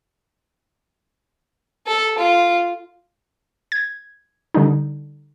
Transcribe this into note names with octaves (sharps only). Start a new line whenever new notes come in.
A4
F4
G#6
D3 G3 D4 D#4